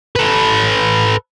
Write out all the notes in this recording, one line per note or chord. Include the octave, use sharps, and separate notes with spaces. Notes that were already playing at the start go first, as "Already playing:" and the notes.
A4 B4